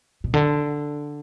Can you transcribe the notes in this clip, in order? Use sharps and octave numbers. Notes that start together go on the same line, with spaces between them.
B2
D3